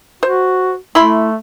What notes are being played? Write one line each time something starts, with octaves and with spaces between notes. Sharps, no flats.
F#4 C5
A3 E4 B5 C6